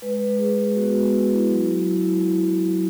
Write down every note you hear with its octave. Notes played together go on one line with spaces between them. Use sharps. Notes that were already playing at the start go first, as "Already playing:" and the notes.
G#3 B4
G#3
G#3 G#4
G#3
B3 F#4
G#3
E4
E4
F#3
E4
E4
E4
F#3
F#3
E4